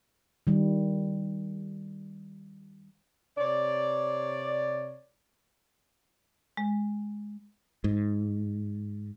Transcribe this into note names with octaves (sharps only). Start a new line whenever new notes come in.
D#3 G3
C3 C#5 D5
G#3
G#2